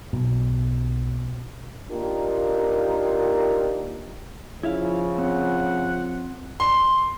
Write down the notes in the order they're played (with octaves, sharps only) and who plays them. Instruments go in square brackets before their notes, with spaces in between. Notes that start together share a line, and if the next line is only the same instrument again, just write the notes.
[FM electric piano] B1 [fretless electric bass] B2
[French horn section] A#3 D4 D#4 F4 G4 A#4
[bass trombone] C#3 [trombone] F3 [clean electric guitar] E4 E5 F5
[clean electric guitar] C4 [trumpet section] F#5
[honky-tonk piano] C6